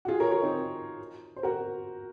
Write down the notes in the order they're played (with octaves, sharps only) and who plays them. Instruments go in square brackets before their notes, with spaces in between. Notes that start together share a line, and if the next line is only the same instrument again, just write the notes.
[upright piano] F#4
F4 G#4
A#4 C#5
A#4 C#5
C4 D#4
C5
F#4 A#4